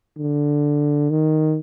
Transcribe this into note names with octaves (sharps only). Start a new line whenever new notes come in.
D3
D#3